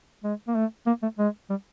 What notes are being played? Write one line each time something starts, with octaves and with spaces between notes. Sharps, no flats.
G#3
A#3
A3
A#3
A3
G#3
G3